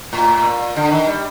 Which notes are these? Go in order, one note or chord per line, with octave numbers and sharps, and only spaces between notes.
A2
A#2
D3
D#3
G3